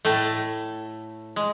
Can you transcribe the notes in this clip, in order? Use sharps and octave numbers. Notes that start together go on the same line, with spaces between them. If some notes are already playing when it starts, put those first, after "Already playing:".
A2 A3
G#3